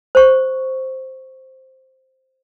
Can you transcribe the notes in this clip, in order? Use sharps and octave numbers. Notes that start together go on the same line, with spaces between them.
C5 C#6